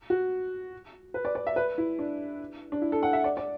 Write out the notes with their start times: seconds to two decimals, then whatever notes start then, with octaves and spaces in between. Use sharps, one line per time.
0.10 F#4
1.14 B4
1.25 D5
1.35 D5
1.47 E5
1.56 B4
1.78 E4
1.99 D4
2.72 D4
2.82 E4
2.92 A4
3.03 F#5
3.13 E5
3.24 D5
3.37 D5